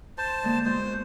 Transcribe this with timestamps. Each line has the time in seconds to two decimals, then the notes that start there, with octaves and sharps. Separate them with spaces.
0.18 C5 A5 C6
0.43 D3 G#3 A#3
0.65 B2 G#3 C5
0.86 F#4